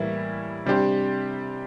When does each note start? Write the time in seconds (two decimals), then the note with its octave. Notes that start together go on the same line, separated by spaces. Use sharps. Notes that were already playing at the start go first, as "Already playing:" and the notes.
Already playing: A2 E3 G3 A#3 E4
0.66 C3 G3 D4 G4 C5